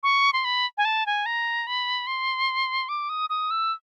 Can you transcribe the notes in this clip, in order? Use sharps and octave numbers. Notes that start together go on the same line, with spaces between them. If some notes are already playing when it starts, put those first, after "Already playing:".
C#6
C6
B5
G#5
A5
G#5
A#5
B5
C6
D6
D#6
D#6
E6